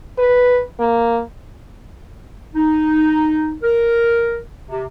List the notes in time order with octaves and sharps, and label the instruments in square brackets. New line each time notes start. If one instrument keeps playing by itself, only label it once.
[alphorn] B4
A#3
[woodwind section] D#4
A#4
C3